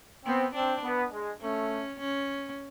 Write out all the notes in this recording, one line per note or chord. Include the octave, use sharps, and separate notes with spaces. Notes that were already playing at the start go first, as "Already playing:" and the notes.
B3 C4
C4 D4
B3
G#3
A3 C#4
C#4